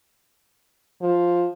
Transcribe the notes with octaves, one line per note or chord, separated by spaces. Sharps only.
F3